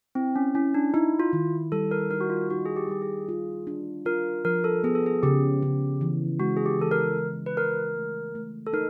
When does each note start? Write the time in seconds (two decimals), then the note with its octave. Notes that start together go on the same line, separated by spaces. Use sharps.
0.15 C4 E4
0.36 C#4
0.55 C#4 E4
0.74 D4
0.94 D#4 E4
1.19 F4
1.33 D#3
1.72 G3 A4
1.91 A#4
2.10 D#4 A#4
2.21 F#4
2.30 F4
2.50 D#4 F#4
2.66 G#4
2.76 G4
2.89 G3 G4
3.02 G#4
3.28 F4
3.67 D4
4.05 F4 A#4
4.45 F3 A#4
4.64 A4
4.84 B3 G#4
4.95 A4
5.06 G#4
5.23 C#3 G4
5.62 C#3
6.01 E3
6.40 G#3 F#4
6.57 G#4
6.66 G4
6.79 E3 A4
6.91 A#4
7.18 E3
7.46 B4
7.57 C#3 A#4
7.96 A3
8.35 A3
8.66 A4
8.73 D#4 A#4